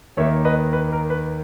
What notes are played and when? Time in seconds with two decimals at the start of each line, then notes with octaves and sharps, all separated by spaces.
0.17 D#2 D#3 A#3 C#5 E5
0.45 B4 D#5
0.73 B4
0.92 A#4
1.10 B4